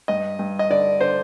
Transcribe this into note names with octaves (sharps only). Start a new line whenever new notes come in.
G2 D#5
G2
D#5
D3 D5
D3 C5